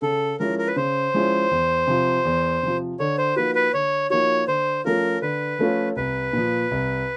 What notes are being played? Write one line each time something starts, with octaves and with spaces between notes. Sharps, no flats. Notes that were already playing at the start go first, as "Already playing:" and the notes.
C#3 A4
F3 G#3 C#4 E4 A#4
A#4
B4
C#3 C5
F3 G#3 C#4 E4
E2
C3 F3
E2
C3 F3
D3 C#5
C5
F3 A#3 D#4 F#4 B4
B4
D3 C#5
F3 A#3 D#4 F#4 C#5
D3 C5
F3 A3 C#4 F4 A#4
D3 B4
F3 A3 C#4 F4
C2 B4
A#2 F3
C2